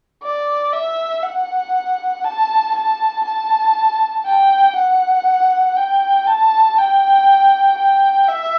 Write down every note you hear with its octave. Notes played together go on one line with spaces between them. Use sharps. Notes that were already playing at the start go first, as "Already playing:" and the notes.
D5
E5
F#5
A5
A5
A5
G5
F#5
G5
A5
G5
G5
E5